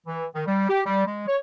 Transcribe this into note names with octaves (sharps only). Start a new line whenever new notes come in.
E3
D#3
G3
G4
G3
G#3
C#5